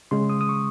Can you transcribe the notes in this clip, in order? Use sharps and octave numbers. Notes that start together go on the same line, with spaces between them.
C#3 G#3 C6
D#6
D#6
C#6